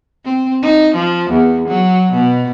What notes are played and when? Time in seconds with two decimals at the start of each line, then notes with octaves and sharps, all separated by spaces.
0.25 C4
0.62 D#4
0.94 F3
1.30 E2
1.68 F#3
2.12 B2